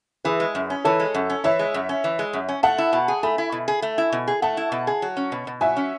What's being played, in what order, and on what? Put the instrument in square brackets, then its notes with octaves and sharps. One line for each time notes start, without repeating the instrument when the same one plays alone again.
[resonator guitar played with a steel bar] E3 [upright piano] G#4 B4
[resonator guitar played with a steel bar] G#3
F#2
C#4
[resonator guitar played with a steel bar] E3 [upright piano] A4 C#5
[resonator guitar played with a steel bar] G#3
F#2
C#4
[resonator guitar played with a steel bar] E3 [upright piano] C#5 E5
[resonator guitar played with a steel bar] G#3
F#2
C#4
E3
G#3
F#2
C#4
[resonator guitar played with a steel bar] A3 [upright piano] F#5 A5
[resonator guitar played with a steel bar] E4
B2
G#4
[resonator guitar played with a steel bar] A3 [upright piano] G#5 B5
[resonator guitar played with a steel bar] E4
B2
G#4
A3
E4
B2
G#4
[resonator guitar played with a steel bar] A3 [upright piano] F#5 A5
[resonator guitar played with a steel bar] E4
B2
G#4
F#3
C#4
B2
B2
[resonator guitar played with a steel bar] F#3 [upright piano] E5 G#5
[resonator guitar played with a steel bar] C#4